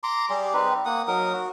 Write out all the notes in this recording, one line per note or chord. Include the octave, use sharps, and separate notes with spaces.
A#5 C6 D6
G3 G4 G#4
C4 D#4 B4
A#3 F#5 D#6
F#3 D#4 A#4 D#6
F#4